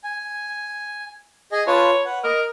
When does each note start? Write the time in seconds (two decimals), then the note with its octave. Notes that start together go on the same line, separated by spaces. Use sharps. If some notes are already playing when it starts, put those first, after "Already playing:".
0.04 G#5
1.52 G#4 D#5 G#5
1.67 F4 B4 C#5 A5
2.05 B4 F#5
2.24 A#4 D#5